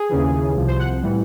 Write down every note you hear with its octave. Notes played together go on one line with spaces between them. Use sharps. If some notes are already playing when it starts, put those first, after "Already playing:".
Already playing: G#4
D#2 C#3 E3
C2 C3 F3
C5
F#5
A2 E3 G3